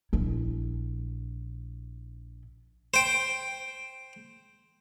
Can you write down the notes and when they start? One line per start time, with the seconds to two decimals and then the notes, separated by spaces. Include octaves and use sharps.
0.13 A#1 E4
2.94 C5 G5